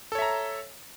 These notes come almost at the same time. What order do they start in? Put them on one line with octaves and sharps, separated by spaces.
A4 C#5 E5 A#5